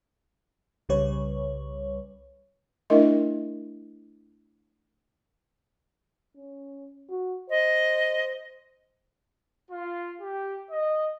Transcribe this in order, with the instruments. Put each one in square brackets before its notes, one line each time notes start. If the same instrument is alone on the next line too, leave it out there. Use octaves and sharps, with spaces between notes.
[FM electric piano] C2 C#3 G3 B4 C#5
[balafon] A3 D4 E4 A#4 D#5 E5
[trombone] C#4
F#4
[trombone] C5 [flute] D#5
[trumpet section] F4
G4
D#5